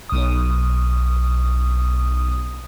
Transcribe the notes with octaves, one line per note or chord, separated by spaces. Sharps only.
B1 D#6